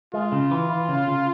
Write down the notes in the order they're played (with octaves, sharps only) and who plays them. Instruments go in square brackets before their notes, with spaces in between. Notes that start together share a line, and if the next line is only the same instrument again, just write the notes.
[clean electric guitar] G#3 [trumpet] F4
[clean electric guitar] C#3
E3
E3
C#3
C#3